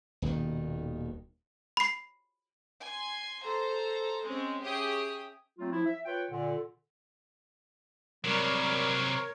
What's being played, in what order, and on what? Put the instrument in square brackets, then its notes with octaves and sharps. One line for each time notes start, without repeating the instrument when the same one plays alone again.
[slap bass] D#1 D#2 B2 D#3
[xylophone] B5 C7
[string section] G#5 C6
A4 C5 A#5
G#3 C4 C#4
C#4 G4 G#4 E5 G5 D#6
[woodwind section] F#3 A3 C4 F4
F3 E4
E5
F4 B4 C#5 G5
A#2 D3
[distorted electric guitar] C3 F#3 [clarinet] G3 [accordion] A#4 C#5